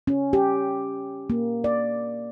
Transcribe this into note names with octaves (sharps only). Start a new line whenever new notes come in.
C#4
G4
A#3
D5